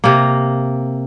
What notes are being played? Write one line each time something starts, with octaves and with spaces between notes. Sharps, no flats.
C3 A#3